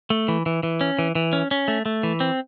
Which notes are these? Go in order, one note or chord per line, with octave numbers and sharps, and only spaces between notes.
A3
E3
E3
E3
C#4
E3
E3
C#4
C#4
A3
A3
E3
C4